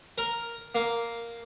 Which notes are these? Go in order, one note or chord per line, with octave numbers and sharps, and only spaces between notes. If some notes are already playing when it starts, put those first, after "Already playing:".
A#4
A#3